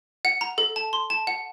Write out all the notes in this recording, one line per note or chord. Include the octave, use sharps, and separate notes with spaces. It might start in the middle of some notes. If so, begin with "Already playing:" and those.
F#5
A#5
A4
A5
C6
A5
F#5